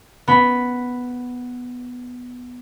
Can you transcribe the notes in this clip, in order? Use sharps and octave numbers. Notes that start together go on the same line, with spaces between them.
B3 B5